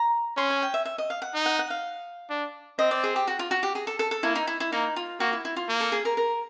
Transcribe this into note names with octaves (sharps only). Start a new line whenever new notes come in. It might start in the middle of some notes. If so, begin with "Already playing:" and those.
Already playing: A#5
C#4 C6
G#5
G5
E5
E5
D#5
F5
F#5
D#4
F#5
F#5
F5
D4
C4 D#5
D5
G#4
G4
F#4
F4
F#4
G4
G#4
A4
A4
A4
A#3 E4
D#4
E4
E4
A#3 D#4
F4
A#3 F#4
E4
E4
F4
A#3
A4
G#4
A#4
A#4